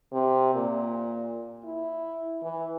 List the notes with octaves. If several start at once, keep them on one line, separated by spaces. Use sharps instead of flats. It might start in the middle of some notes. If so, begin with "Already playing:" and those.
C3
A#2
E4
E3